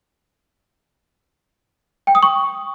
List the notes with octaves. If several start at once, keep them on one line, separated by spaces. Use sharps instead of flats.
G5
D#6
C#6